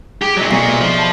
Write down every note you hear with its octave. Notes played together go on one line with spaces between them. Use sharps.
G4 G#4
A#2 F#3 D5 E5
B1 A#2
B3
F3
A5 B5